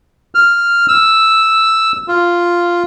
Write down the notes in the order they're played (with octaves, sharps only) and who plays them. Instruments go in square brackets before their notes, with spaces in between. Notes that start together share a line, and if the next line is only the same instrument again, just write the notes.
[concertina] F6
E6
F4